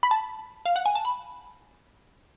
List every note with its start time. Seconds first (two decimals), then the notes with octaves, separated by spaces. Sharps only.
0.03 B5
0.11 A5
0.65 F5
0.76 F#5
0.86 G#5
0.95 A5
1.05 B5